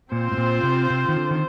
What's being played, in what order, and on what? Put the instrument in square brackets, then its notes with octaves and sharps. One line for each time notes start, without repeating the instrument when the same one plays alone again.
[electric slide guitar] A#2 [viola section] C4 F4 C5
[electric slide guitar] A2
A#2
C3
C3
D#3
D3
D#3